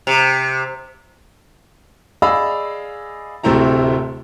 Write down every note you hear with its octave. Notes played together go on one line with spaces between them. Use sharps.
C3
G#4 D5 D#5 F5 B5 E6
D1 C3 A3 C4 E4 A#5